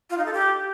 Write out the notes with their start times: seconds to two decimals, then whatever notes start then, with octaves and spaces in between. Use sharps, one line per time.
0.10 F4
0.18 D#4
0.26 A4
0.33 G4